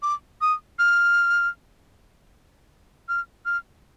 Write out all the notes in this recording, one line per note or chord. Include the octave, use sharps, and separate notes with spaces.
D6
D#6
F6
F6
F6